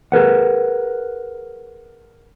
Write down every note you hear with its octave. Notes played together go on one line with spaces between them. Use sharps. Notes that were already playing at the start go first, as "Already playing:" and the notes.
G#4 A#4 B4 F#5